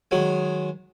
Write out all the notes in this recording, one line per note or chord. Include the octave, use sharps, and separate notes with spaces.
D#3 F#3 G#3